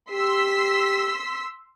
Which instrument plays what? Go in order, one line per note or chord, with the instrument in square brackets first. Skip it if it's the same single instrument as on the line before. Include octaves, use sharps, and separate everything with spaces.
[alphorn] G4 [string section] C6 E6 B6